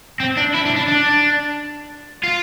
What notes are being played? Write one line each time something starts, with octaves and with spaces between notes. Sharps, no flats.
C4
D4
E4
D4
D4
D4
F4